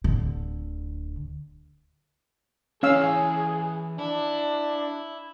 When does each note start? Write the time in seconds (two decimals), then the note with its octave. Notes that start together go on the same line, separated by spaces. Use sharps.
0.04 D1 D3
2.83 E3 C#4 G#4 C#5 F5 E6
3.99 D4 E4